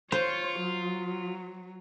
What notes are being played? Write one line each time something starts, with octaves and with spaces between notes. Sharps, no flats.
F4 C5 C#5
F#3